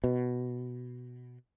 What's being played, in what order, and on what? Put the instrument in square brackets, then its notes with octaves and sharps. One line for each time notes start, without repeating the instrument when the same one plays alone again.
[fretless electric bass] B2